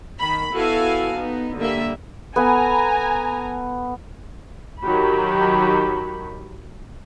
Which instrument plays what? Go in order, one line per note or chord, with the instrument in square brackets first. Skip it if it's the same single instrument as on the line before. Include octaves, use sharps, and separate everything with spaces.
[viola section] D#3 B5
B3 E4 F#4 A4 F5 G#5
B3 D#4
D3 G3 A#3 E5
[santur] B3 A4 B4 [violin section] G#5 A#5
[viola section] D#3 F#3 G4 B5